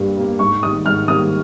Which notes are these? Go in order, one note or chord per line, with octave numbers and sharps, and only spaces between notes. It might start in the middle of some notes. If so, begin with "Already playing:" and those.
Already playing: G2 G3 A#3
G3 A#3
G#2 C#6
D#3 G3 A#3 D#6
G#2 F6
D#3 G3 A#3 D#6